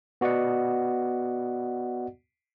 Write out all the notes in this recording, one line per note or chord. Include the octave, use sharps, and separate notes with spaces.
B3 F#4 D5 D#5 F#5